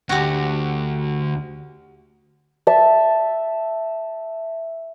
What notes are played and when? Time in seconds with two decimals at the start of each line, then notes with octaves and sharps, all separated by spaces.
0.09 D2 F#4 G4
2.67 E5 A5